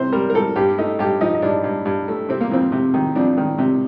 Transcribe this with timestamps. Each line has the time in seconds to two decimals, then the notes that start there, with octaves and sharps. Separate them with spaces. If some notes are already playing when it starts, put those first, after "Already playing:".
Already playing: C3 G3 C5
0.12 G3 A#4
0.30 A#4
0.35 G3 A4
0.56 G2 G4
0.78 A3 D#4
0.99 G2 G4
1.21 F3 D#4
1.35 D#4
1.42 G2 D4
1.64 G2
1.85 G2
2.08 A3
2.29 C3 C4
2.41 A#3
2.51 F2 C4
2.72 C3
2.94 D#3
3.16 F2 D4
3.37 D#3
3.58 C3